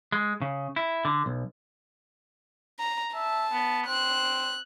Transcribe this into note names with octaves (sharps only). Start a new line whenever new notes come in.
G#3
C#3
E4
D3
B1
A#5
E5 A5
B3
C4 F#6